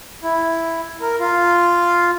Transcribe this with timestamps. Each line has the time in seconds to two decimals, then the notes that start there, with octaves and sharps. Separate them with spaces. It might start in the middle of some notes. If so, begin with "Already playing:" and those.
0.23 E4
1.01 A#4
1.20 F4